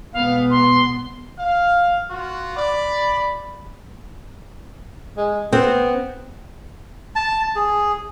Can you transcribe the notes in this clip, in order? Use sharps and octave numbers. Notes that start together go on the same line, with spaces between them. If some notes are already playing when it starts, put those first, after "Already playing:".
B2 G#3 B3 F5
C6
F5
F4 F#4
D5 B5
G#3
B3 C4
A5
G#4